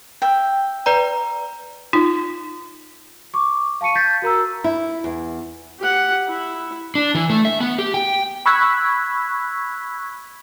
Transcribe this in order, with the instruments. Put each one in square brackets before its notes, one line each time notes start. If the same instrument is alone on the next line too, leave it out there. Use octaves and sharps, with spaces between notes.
[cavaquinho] E5 G5
[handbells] B4 D5 A#5
[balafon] D#4 F4
[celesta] C#6 D6
F5 A5 C#6 C#7 D#7
G6 A6 B6 C7
F#4 A#4 A#5 E6
[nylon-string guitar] E4
E2
[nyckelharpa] G4 F#5
E4
[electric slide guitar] D4
E3
A3
E5
B3
G4
G5
[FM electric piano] B5 C#6 E6 F#6 G#6 B6